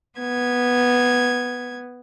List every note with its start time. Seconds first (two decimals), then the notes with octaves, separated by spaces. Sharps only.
0.18 B3 G#6